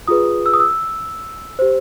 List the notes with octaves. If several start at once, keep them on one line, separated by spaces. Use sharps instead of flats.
F4 G#4 B4 D#6
E6
D#6
E6
G4 C5